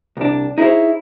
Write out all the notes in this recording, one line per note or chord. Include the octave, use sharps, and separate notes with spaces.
C2 D4
D#4 E4 G#4 C5 C#5